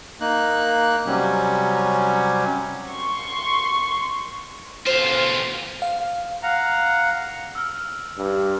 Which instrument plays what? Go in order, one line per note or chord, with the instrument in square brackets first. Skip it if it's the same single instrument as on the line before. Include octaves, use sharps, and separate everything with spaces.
[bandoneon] A#3 D#4 F#6
C3 F#3 G3 C#4
[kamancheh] C6 C#6
[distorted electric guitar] B1 F4 [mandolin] C5
[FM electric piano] F5
[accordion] F5 F#5 A#5
[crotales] E6 F6
[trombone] G2